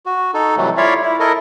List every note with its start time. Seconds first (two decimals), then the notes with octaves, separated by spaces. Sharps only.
0.06 F#4
0.34 D#4 A4
0.57 C3 E3 F#3 G3 A3
0.77 E4 F4 C#5 D5 E5 F5
1.03 E4
1.20 E4 A4 A#4 D#5